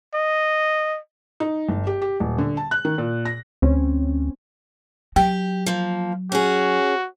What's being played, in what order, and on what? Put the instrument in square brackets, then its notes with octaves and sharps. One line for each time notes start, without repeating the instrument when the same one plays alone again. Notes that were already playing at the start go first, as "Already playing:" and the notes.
[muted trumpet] D#5
[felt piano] D#4
G1
G4
G4
D#1
D3
A5
F#6
D#3
A#2
A#6
[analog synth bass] D2 [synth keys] C4 C#4
[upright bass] F#3 [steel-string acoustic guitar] G4 [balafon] G5
[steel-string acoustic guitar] F3 A#3
[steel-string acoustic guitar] C#4 G#4 [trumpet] F#4